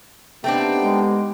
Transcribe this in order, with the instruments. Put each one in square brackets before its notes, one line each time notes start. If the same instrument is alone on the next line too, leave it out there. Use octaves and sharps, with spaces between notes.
[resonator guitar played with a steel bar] A3 C4 D4 [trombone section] B3 D#4 G4 [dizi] G5
[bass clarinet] G#3